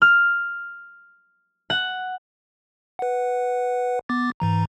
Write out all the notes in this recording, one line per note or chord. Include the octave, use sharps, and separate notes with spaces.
F6
F#5
B4 F#5
B3 D6 A6
G#2 E3 A#5